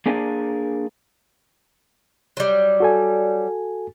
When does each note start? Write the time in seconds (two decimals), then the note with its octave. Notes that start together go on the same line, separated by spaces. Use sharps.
0.06 A#3 D4 G#4 A#4 D5 G#5
2.37 F#3 G3
2.80 F#4 A4 G#5